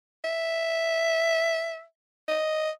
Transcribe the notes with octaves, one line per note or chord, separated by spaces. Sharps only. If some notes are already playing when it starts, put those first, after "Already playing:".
E5
D#5